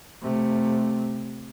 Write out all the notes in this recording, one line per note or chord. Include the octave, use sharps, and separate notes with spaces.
C3 A3